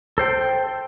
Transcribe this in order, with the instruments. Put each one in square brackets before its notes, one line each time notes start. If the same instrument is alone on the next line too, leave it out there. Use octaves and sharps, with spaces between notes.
[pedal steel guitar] A4 C5 G5